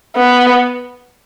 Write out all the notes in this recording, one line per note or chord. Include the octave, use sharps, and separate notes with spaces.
B3